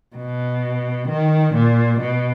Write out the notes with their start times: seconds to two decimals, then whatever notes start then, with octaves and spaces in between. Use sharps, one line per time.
0.16 B2
1.08 D#3
1.54 A#2
2.00 B2